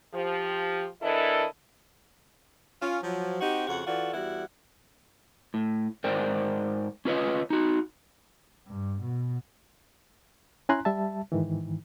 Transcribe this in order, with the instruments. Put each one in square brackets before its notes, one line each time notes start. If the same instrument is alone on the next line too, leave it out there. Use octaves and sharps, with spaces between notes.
[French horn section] F3 G4
E3 D4 E4 A4 A#4 D#5
[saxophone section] C#4 F4
F3 F#3
C4 D#4 F#4 G4
F2 C#3 F#4 F#5
E3 F4 F#4 A4 D5
E2 G3 E4 F#4 F#5
[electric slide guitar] A2
G#2 A#4 C5 D5 G5
C#4 F4 B4 C#5 D#5
D#4 F#4
[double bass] G2
B2
[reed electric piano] C#4 E4 G#5 A#5 C6 F#6
G3 E5 A5
G#2 D#3 E3